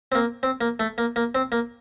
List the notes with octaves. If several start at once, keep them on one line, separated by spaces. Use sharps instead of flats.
C4
A#3
C4
A#3
A3
A#3
A#3
C4
A#3